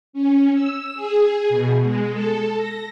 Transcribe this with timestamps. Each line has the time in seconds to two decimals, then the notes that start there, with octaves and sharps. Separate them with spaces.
0.13 C#4
0.54 E6
0.95 G#4
1.49 B2
1.83 G#3
2.12 A4
2.57 A#6